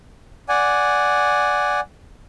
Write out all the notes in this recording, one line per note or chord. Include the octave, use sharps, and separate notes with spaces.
D5 F#5 G#5